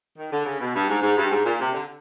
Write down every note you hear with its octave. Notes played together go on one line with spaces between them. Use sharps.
D#3
D3
C#3
B2
G2
G#2
G#2
G2
G#2
A#2
C3
D3